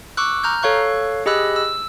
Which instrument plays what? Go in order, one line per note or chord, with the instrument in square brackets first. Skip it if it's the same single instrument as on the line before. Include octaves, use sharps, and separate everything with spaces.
[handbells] C#6 D6 E6 F#6
A#5 F6 G6
A4 C#5 F5 C#6 F#6
G4 G#4 D#5 B5 E6 F#6
E6